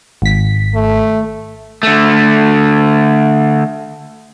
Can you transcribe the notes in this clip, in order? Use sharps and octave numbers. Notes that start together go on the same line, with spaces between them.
G#1 B6
A3
D3 A3